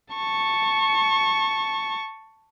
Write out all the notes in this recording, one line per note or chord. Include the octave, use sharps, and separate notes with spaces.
A5 C#6